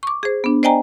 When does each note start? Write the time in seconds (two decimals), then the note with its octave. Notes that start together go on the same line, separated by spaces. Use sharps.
0.03 C#6 D6
0.23 G#4 C5
0.44 B3 D4
0.63 C5 D5 D#5 G5 G#5 A#5